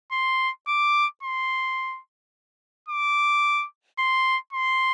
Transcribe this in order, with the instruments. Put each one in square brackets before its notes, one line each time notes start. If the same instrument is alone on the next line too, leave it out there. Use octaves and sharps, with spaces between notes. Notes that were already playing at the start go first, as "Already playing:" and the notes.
[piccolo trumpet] C6
D6
C6
D6
C6
C6